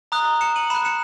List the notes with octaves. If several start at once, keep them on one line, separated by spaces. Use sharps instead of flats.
A#5 D#6 F#6
C#7 E7
D#7 F#7
B5 F#6 C#7 E7
C#7 E7